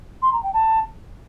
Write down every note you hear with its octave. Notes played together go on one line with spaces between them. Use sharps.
C6
A#5
G5
A5